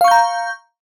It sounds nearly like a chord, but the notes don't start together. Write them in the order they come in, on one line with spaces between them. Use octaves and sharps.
F5 C#6 G6 A#5